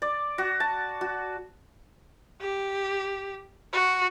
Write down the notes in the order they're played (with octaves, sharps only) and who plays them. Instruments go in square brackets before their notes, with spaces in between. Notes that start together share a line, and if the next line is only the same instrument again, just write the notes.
[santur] D5
F#4
A5
F#4
[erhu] G4
F#4